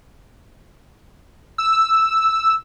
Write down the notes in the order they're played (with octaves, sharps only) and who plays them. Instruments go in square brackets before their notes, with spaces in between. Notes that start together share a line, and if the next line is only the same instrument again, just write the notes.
[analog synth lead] E6